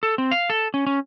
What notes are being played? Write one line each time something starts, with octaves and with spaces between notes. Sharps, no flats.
A4
C4
F5
A4
C#4
C#4